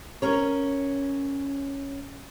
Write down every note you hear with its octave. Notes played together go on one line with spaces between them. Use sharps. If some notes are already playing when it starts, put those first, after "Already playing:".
C#4 A#4 C#5